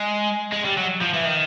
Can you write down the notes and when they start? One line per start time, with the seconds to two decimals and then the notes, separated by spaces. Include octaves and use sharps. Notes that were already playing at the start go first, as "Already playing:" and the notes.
Already playing: G#3
0.52 G#3
0.65 G3
0.77 F#3
1.01 F3
1.14 E3
1.26 D#3